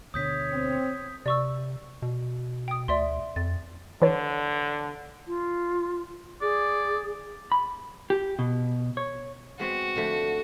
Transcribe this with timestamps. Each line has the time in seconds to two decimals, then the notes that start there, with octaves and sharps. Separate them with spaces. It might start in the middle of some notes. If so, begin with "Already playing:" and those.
0.14 D2 B2 D3 C#5 D#6 G6 B6
0.52 C4
1.26 C3 D5 C#6 E6
2.02 B2
2.68 G5 D#6
2.88 D2 D5 E5 C6
3.36 F2 A6
4.02 D3 E3 B4 C#5
5.27 F4
6.42 G#4 D5
7.52 B5
8.10 G4
8.39 B2
8.97 C#5
9.59 G#3 B3 C4 F#4
9.96 D3 F3 A3